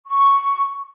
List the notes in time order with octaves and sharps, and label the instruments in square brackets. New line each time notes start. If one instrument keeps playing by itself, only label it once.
[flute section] C#6